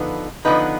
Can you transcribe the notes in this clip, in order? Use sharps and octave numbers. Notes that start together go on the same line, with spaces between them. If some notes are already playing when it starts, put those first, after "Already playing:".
Already playing: D3 F3 B3 D#4 B4
D3 F3 B3 D#4 B4